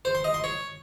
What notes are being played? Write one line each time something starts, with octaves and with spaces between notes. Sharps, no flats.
C5
C6
D#5
C6
C#5